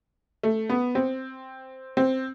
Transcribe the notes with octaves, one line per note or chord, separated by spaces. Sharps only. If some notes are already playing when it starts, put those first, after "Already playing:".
A3
B3
C4
C4